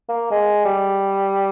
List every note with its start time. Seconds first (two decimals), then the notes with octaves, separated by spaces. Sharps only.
0.09 A#3
0.31 G#3
0.65 G3